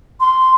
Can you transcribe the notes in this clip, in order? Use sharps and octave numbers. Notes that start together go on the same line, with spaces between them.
C6